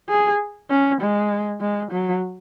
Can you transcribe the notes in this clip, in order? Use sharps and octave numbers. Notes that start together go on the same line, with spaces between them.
G#4
C#4
G#3
G#3
F#3